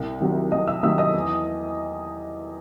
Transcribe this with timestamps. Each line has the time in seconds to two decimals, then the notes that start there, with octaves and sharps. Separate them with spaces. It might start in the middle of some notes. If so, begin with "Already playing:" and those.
Already playing: C2
0.20 C3 D#3 F#3
0.52 C2 D#5 D#6
0.67 E5 E6
0.83 C3 D#3 F#3 E5 E6
0.98 D#5 D#6
1.14 E2